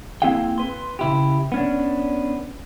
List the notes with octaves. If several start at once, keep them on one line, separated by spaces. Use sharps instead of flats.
A#3 C4 E4 G#4 F5 G5
B4 C6
C#3 E4 G4
B3 C#4 D4